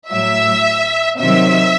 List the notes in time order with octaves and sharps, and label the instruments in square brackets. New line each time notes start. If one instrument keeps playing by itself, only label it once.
[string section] A2 F#3 E5
C3 D#3 F#3 E5